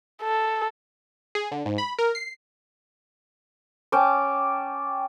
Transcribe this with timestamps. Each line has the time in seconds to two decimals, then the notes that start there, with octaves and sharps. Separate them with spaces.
0.22 A4
1.35 G#4
1.52 D3
1.66 G#2
1.78 B5
1.99 A#4
2.15 C7
3.92 C#4 G5 A5 D6